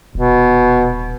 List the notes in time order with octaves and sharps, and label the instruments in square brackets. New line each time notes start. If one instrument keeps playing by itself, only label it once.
[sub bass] D#1 [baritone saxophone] B2